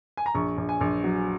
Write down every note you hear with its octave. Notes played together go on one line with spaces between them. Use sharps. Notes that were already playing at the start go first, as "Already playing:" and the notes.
G#5
A#5
A#1 C#6
A#1
G#5
A#1
F#3